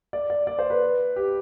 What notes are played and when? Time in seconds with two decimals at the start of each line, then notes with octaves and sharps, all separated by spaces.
0.13 D5
0.30 D5
0.47 D5
0.59 C5
0.70 B4
1.16 G4